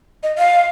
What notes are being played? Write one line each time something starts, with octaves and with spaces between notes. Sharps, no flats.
D#5
F5